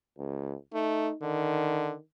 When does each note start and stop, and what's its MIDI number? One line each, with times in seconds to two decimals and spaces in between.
0.18 0.56 37
0.74 1.09 57
0.74 1.15 63
1.22 1.93 50
1.22 2.01 51